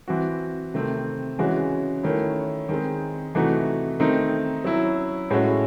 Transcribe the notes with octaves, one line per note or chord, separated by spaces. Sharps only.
E3 C4 F#4
C3 D#3 A3 C4
C#3 E3 G#3 C#4 F#4
D#3 A3 C#4 E4
D#3 G#3 C4
C3 E3 A3 D#4 F#4
D#3 A3 C4 D#4
F#3 C#4 E4
A2 G#3 C#4 F#4